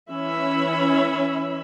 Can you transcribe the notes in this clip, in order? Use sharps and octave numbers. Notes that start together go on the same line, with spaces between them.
E3 C#4 E5 B5